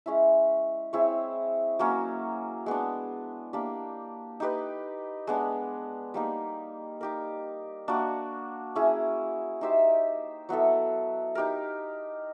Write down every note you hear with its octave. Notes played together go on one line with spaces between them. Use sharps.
G#3 C#4 E4
C4 E4 G#4 C#5
F#3 A#3 C#4
G#3 B3 D4
A#3 D4 G4
D#4 G4 B4 D#5
G#3 B3 D4
G3 A#3 D#4
D#4 G4 A#4
A#3 D4 F#4
C#4 E4 G#4
D#4 G4 C5 E5
F#3 B3 E4 A4
D#4 G4 A#4